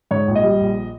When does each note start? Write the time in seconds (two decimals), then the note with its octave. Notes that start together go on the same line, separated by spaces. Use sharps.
0.11 G#2 C#5
0.27 A#1
0.35 D#5
0.43 G3
0.60 A#1